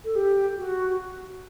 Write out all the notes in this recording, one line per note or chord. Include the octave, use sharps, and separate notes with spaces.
A4
G4
F#4